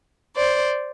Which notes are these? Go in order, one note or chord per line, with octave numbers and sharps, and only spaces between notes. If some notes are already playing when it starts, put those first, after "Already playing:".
C5 D5